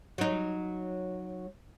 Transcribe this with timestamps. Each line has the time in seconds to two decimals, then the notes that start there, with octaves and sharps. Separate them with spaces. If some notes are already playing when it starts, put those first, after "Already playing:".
0.18 F#3 D#4